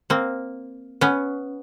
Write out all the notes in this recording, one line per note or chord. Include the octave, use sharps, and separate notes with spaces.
A#3 C4
B3 C#4